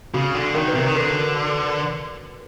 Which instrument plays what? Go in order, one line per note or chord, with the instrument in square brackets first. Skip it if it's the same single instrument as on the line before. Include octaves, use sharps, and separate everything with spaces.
[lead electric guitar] C#3 [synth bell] F#4
[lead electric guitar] D3
[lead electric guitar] D#3 [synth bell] A#4
[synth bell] B4
[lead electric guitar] C3 [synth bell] A#4
[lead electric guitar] D#3
[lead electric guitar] D3 [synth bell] A#4